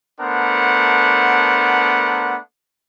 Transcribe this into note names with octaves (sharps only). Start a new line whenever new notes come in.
A3 B3 D4 A#4 C5 F#5